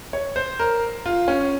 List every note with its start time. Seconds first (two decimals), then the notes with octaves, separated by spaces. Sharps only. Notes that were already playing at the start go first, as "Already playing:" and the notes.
0.13 C#5
0.36 C5
0.59 A#4
1.06 F4
1.28 C#4